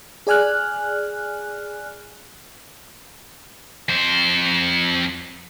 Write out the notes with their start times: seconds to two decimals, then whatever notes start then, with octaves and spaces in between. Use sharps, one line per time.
0.27 G#4 D5 G#5 F6 F#6
3.89 F2 C5